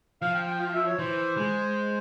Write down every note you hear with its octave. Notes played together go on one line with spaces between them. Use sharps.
F3 F5
G5
G5
F5
E5
C#5
E3 C5
G#3